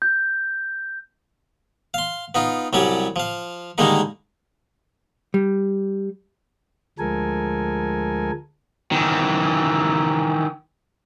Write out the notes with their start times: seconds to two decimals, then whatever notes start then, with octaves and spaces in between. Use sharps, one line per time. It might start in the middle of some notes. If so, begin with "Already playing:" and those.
0.02 G6
1.94 F5 C6
2.35 B3 D#4 F4
2.73 C2 F#3 G3 C#4 D5
3.16 F3 F5
3.78 D3 D#3 G3 G#3 A#3 D#4
5.34 G3
6.99 D2 F3 G#3 A4 A#4 G#5
8.92 D#3 E3